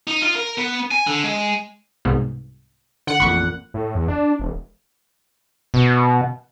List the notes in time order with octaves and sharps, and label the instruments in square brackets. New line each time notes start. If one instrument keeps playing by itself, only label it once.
[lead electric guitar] D#4
F4
A#4
B3
G#5
D3
G#3
[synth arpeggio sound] C2 G#2 B2
[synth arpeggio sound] D3 [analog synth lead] F#5
[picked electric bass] A1 F2 A#2 [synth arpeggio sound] B5 C#6
[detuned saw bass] A2
E2
D4
E1
[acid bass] B2